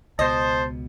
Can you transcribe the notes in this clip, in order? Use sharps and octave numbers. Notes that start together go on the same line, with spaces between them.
C#2 B2 C5 D#5 A5